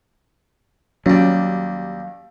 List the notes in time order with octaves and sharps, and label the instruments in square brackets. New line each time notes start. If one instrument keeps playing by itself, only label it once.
[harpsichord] D#2 G3 [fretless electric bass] F#3 C#4